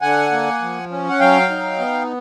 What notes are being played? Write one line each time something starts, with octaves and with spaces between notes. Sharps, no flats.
D3 F#5 G#5
A#3
F3
C#4
F#5
F#3 F5 G5
D#4
B3